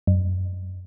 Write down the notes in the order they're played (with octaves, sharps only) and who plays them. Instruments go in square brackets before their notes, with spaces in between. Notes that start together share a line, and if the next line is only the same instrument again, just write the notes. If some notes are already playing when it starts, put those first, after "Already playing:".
[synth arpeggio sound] F#2